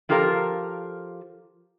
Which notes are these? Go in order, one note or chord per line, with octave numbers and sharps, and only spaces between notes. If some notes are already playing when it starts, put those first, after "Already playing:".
F3 F4 G4 A4 A#4 F5